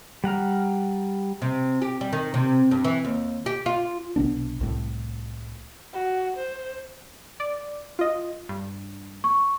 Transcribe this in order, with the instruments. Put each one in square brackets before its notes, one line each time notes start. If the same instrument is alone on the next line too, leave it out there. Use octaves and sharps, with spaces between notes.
[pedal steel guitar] G3 F#5 A#5 F6
[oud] C3
G4
G3
D#3
C3
G2
E3
D#2
G4
F4
[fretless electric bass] B1 C3 B3 D4
C2 A2
[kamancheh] F#4
C5
[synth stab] D5
F4 D#5
G2
[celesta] C#6